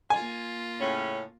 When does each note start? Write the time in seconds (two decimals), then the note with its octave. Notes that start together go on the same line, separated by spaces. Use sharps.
0.10 A#3 F4 G#5 A6
0.80 A2 C#3 C#4